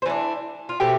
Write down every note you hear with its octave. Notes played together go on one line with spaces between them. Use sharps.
C5
E3 A3 D4 B4
F4
B2 A3 C4 G4